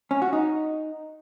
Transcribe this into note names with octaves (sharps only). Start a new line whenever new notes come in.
C#4
F#4
D#4